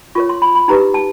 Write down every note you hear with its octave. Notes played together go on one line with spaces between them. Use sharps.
F4 A#4 C#5 C#6
C6
B5
B5
D#4 G4 B4 A#5
A5